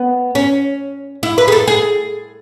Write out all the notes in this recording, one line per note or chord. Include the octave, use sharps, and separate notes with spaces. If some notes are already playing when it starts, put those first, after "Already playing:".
Already playing: B3
C#4
E4
B4
G#4
A4
G#4